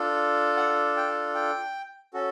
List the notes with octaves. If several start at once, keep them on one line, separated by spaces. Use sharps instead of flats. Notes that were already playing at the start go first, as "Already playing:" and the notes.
Already playing: D4 F4 A4
F#5
G5
G5
C#4 F#4 A4